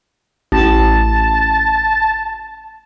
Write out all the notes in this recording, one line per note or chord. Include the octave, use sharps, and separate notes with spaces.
A1 A5